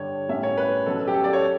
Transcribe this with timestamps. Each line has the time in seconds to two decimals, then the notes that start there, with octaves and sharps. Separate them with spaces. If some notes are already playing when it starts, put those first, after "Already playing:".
Already playing: G2 D3 G3 C#5
0.29 A2 G3 C#4 E5
0.43 C#5
0.57 B4
0.86 B2 F#3 C#4 A4
1.07 G4
1.14 A4
1.24 D5
1.33 C#5